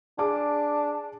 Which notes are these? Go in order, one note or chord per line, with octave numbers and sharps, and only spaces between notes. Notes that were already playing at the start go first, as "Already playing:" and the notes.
D4 G#4 D6